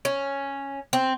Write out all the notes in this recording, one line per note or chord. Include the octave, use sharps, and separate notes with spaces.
C#4
C4